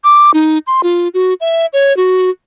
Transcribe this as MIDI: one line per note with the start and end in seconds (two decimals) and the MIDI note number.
0.04 0.31 86
0.34 0.58 63
0.67 0.81 84
0.83 1.08 65
1.14 1.34 66
1.41 1.66 76
1.73 1.96 73
1.97 2.30 66